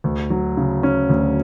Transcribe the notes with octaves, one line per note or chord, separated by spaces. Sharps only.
D2
F#3
C#3
C#4
D2